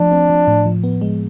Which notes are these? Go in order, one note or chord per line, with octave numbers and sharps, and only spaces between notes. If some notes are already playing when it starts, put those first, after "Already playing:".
Already playing: F3 A3 D4
C4
F3
A2
F3
B3
G#3